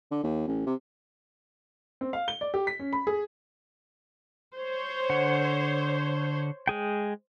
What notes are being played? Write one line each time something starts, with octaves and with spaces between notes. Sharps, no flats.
D3
D#2
A1
C3
C4
F5
G7
D5
G4
B6
C#4
B5
G#4
C5 C#5
D3 F#5
G#3 G#4 G5